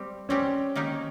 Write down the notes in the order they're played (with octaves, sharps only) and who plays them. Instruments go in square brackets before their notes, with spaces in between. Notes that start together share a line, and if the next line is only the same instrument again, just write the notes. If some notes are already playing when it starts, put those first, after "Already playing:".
Already playing: [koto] G3 C4 G4
[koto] G3 C4 G4 [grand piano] C#4
[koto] D#3 A#3 D#4 G4